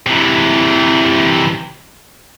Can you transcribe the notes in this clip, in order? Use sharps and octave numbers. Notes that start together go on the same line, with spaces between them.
C3 E3